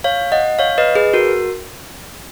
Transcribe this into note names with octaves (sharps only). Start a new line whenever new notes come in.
C#5 F5
D#5 F#5
C#5 F5
B4 D#5
G#4 B4
F#4 A#4